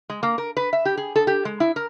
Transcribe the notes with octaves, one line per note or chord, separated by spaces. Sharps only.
G#3
A#3
A#4
B4
E5
G4
G#4
A4
G4
G#3
E4
A#4